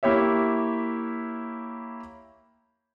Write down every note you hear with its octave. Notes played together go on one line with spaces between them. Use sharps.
A#3 E4 G4 C#5 E5